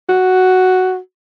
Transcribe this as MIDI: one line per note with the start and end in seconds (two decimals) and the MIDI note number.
0.09 0.98 66